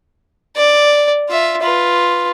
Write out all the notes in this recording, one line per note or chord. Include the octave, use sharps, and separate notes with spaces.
D5
F4 E5
F4 B4